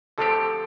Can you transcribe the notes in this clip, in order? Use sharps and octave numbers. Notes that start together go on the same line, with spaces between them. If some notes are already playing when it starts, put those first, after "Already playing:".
D3 F3 A3 C4 G4 A4